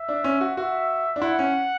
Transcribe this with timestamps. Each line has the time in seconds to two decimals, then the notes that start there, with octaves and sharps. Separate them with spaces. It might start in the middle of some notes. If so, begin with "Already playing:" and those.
Already playing: E5
0.09 D4
0.24 C#4
0.41 F#4
0.56 F#4 E5
1.16 D4
1.21 E4 F#5
1.39 C#4